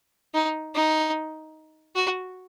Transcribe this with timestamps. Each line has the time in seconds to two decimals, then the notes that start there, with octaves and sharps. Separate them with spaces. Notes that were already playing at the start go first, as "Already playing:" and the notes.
0.34 D#4
0.75 D#4
1.96 F#4